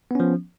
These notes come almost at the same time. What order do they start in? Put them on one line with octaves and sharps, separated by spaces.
B3 C#4 F3